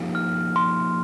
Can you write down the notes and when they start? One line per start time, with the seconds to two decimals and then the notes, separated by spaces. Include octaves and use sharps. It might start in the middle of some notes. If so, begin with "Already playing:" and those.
Already playing: F3 A#3 D#4 G4
0.15 F6
0.56 C6